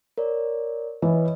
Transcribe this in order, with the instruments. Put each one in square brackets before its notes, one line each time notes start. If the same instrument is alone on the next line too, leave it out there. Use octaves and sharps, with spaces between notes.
[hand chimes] A#4 C#5 D5
[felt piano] E3 [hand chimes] B4 C#5 D#5